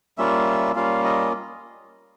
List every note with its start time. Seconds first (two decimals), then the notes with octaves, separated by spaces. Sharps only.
0.18 G3 A#3 C#4 F4 E5
0.75 G3 A#3 C#4 F4 F5
1.04 D#5